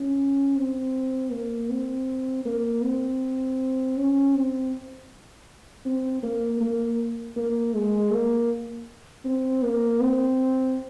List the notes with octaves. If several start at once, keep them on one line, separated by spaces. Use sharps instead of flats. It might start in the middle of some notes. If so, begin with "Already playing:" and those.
Already playing: C#4
C4
A#3
C4
A#3
C4
C#4
C4
C4
A#3
A#3
A#3
G#3
A#3
C4
A#3
C4